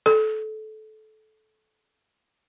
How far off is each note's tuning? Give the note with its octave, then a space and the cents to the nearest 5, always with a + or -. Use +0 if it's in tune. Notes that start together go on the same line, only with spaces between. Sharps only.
A4 -20